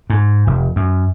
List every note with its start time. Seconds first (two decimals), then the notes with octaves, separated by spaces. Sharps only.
0.10 G#2
0.47 F1
0.76 F#2